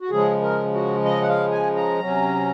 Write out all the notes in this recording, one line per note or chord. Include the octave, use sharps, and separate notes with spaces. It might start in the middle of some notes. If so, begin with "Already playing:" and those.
F#4
C#3 F3 G#3 G#4
A#4
F#4
D#5
F#5
F5
G#5
A#5
C3 F#3 C#4